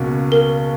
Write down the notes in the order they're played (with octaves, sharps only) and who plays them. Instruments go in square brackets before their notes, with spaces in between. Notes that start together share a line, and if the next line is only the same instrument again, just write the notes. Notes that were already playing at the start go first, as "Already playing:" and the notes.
Already playing: [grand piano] C#2 B2 A#3 C#4 F#4
[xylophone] A#4